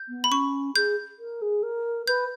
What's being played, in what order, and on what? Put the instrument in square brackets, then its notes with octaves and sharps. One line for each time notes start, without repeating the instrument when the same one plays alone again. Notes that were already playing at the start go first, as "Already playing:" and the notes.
Already playing: [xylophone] G6
[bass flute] B3
[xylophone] B5
[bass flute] C#4 [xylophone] C#6
[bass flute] G#4 [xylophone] G6
[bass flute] A#4
G#4
A#4
[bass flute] B4 [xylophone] G6